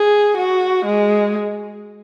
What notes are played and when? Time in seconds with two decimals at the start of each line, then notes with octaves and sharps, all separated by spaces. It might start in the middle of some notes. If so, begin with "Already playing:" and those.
Already playing: G#4
0.37 F#4
0.85 G#3